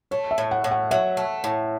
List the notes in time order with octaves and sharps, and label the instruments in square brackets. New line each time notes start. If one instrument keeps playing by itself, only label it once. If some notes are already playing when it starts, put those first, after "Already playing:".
[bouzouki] A3 [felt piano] C#5
[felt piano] E5
[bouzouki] A2
[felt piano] F#5
[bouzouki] A2
[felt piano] F#5
[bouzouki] F#3 [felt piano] E5
[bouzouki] A3
A2